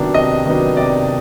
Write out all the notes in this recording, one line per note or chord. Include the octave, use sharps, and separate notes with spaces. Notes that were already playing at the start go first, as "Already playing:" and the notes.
Already playing: C3 D#3 F#3 B3 D4
C3 D#5
D#3 F#3 B3 D4
C3 D5